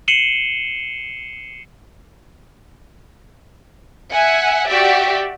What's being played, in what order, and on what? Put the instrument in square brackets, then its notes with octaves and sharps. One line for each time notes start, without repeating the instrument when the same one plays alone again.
[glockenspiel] C7 C#7 D#7 E7 F#7 G7
[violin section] E5 F#5 G#5
F#4 G4 D5 E5